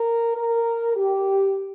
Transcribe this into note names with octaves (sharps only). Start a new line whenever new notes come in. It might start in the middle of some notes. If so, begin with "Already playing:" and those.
Already playing: A#4
A#4
G4